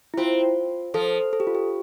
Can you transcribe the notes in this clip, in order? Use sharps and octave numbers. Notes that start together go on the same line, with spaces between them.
E4
C4 F4
F3 A4
A4
G4
F4
G4